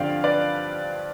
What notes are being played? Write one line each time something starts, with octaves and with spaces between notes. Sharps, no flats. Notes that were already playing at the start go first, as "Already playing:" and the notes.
Already playing: G2 D3 F3 C4 D5 F5 G5
B4 D5